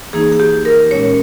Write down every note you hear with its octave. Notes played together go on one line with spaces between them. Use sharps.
E3 A#3 D#4 G#4
G#4
G4
A#4
A#2 G#3 C#4 C#5